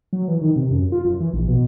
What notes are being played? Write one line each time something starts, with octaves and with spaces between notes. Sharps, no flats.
F#3
E3
D#3
C3
F#2
F4
F#2
E3
A#1
B2